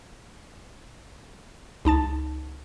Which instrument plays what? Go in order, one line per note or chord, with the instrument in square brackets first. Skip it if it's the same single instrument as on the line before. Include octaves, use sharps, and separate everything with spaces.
[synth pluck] C#2 D#4 A5 A6